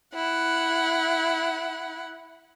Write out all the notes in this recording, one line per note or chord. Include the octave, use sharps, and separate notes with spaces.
E4 F#5